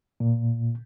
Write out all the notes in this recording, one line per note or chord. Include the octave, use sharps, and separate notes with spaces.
A#2